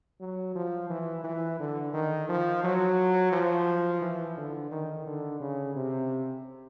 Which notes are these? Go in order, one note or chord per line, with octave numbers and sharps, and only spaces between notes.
F#3
F3
E3
E3
D3
D#3
F3
F#3
F3
E3
D3
D#3
D3
C#3
C3